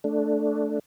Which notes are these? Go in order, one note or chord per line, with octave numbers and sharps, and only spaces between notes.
A3 D4